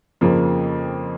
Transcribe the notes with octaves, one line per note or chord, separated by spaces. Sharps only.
F2 C#3 F3 A#3